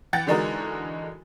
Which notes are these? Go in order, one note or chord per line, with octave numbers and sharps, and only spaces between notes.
E3 F#5 G5 A6
D3 E3 G#3 D#4 F#4 A#4